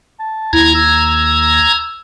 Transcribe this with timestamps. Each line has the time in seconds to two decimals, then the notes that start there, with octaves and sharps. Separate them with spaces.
0.20 A5
0.53 D#2 E4 A#5 G#6
0.75 E6